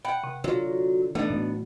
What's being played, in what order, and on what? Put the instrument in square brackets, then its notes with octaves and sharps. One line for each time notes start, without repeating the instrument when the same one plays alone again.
[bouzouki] F#5 [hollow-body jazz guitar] G5 [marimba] B5
[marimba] C3
[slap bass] D3 [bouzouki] F#3 [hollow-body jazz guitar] F4
[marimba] E3 [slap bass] A3 [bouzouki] B3 [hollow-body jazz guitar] D4 D#4 D5
[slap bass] A2 F#3